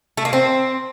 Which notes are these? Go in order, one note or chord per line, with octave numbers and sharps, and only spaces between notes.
A3
A#3
C4